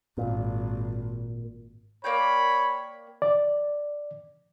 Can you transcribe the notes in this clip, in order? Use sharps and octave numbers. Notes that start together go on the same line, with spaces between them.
G#1 A#2
A#3 C#5 D5 G5 B5
D5